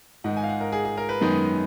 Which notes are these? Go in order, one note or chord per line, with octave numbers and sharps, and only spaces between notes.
G#2 D#3 G#3 D#4 F#5
G#5
F5
F#5
A#4
G#4
G#4
A#4
B4
F#2 D#3 G#3 B3 D#4